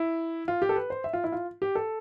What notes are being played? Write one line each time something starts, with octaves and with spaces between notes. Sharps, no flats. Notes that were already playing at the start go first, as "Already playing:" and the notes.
Already playing: E4
F4
G4
A4
B4
C5
E5
F4
E4
F4
G4
A4